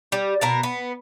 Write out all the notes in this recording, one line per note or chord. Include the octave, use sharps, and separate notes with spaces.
G3
B2 A#4 A5
B3